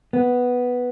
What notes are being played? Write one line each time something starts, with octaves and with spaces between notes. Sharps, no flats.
B3